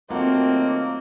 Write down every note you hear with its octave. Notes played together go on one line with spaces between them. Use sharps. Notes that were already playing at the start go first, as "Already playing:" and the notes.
D#2 F#3 A3 A#3 C4 F4 D#5 F#5